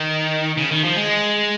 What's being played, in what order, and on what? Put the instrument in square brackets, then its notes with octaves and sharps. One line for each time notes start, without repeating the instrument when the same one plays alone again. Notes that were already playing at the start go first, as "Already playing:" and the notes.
Already playing: [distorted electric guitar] D#3
C#3
D#3
F3
G#3